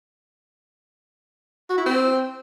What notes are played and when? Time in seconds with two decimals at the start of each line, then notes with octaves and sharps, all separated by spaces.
1.69 F#4
1.78 E4
1.86 C4